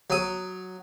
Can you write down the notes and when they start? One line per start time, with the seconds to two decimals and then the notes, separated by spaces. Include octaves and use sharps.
0.10 F#3 D#6